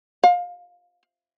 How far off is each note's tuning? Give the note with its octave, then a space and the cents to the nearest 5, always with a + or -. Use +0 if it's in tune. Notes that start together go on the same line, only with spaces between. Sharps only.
F5 +20